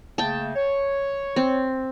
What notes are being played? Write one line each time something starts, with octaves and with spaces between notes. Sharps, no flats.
C#3 A3 A#3 G5 A5
C#5
C4